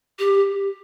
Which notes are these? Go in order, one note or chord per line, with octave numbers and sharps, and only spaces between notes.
G4